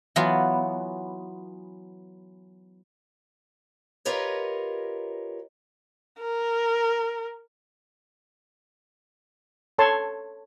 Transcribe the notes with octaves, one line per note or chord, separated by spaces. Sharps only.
E3 F#3 B3 F4 F#4
F4 G4 A#4 B4 C#5 D#5
A#4
A4 C#5 A5 C6